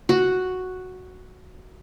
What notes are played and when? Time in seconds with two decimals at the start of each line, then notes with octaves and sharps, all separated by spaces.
0.09 F#4